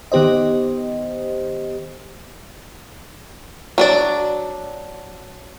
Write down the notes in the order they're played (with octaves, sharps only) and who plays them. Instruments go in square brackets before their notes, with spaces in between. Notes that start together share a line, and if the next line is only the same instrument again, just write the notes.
[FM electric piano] D#3 B3 G4 C5 D#5
[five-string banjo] F#3 D4 D5